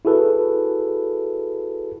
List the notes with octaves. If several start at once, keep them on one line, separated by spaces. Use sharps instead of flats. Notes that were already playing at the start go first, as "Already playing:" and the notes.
E4 F#4 G#4 A4 B4